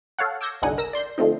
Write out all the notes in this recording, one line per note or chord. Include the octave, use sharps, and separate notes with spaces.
A4 C#5 F5 F#5
D6 E6 G6 G#6 A#6 C#7
G1 C2 D3 D#4 F#5 G#5
A#4 E6 A#6
D5 C6 G6
D3 F3 A3 C4 D#4